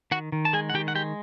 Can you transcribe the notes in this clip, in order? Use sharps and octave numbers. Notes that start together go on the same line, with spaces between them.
D#3 F#4 F#5
D#3
A5
G#3 G#4 G#5
F#5
D#3 G4 G5
F#5
G#3 G4 G5